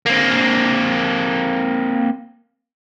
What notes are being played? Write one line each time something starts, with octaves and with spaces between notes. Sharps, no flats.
A#3 C4